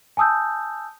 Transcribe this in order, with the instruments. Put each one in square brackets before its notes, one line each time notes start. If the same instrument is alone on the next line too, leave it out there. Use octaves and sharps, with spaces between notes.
[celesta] G#5 A5 D#6 E6 G6